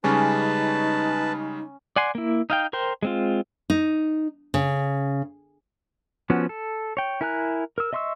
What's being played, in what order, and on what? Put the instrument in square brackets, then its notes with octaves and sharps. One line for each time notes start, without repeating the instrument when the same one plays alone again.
[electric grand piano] C#3 G3 G#3 [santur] C#4 [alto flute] D#4 [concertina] B4 A5
[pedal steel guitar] D5 F#5 G#5 C6
A#3 E4
D#4 F5 G5
A#4 C5 G5
G#3 C4 F4
[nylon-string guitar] D#4
C#3
[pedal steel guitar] F3 B3 C#4 F#4
A4
C#5 G5
E4 A#4 G#5 A#5 F#6
A#4 E6
D#5 E5 C6 C#6 E6